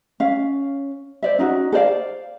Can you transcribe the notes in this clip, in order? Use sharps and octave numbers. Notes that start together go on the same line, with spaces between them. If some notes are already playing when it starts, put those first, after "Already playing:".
C#4 F5
C5 D5 E5
C#4 D#4 F4 F#4
A4 C5 D5 F5